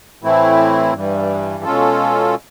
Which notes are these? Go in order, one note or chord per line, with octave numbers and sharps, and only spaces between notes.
A2 E3 A3 C4 E4
G2 E3 G3
B2 G#3 C#4 F4 A4